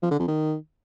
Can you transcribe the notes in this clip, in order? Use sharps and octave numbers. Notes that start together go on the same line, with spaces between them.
F3
D3
F2
D#3